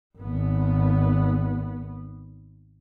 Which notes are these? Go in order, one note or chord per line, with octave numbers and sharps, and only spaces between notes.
G#1 B3